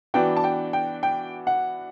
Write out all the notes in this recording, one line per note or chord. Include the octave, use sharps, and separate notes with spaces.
E3 B3 D4 F#4 G5
A5
G5
G5
G5
F#5